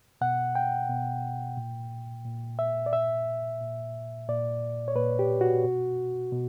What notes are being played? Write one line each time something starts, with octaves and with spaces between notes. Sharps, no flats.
B2 F#5
G5
B2
A#2
A#2
E5
D5
A#2 E5
A#2
A#2 D5
C#5
A#2 B4
G4
F#4
B2
B2